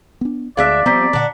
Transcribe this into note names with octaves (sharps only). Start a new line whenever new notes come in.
B3 D4
D2 G#3 D4 D5 E5 F5 B6
F3 G3 B3 C4 A#5 B6
A#2 D3 D4 F#4